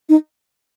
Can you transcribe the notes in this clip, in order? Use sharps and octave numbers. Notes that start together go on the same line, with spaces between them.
D#4